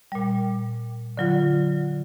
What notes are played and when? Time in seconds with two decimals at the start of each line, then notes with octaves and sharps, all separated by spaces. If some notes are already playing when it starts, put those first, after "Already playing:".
0.12 A#2 G3
1.17 D3 F#3 F4